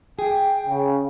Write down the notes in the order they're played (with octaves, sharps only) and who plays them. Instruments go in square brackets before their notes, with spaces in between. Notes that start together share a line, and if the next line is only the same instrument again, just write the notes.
[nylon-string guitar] G#4 [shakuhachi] G5
[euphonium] C#3